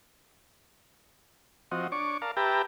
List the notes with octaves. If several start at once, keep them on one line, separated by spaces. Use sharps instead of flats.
F3 C4 F#4 D#5
D4 C#5 C#6 D6
A#4 D5 F5 A5
G4 B4 E5 G5 A5 A#5